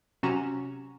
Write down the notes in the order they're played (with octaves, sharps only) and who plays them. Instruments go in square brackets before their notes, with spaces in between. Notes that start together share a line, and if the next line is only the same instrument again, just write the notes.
[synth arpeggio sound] C3 F#3 C#4 F#4 A#5 E7